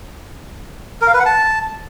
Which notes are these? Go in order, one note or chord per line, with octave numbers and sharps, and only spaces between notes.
A#4
F5
B4
F#5
A5